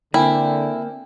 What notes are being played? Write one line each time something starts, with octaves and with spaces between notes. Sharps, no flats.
D3 A#3 C4 E4 G5 G#5